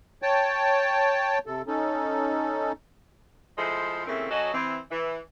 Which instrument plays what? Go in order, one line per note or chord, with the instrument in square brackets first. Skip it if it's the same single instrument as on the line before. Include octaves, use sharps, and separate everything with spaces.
[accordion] C#5 G5 A5
C3 A4
C#4 D#4 A4
[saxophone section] F3 G#3 A3 E4 A4 C5
C#3 E3 A3 A#3 C4
F#3 C#4 F#4 A4 D#5
E3 C4
E3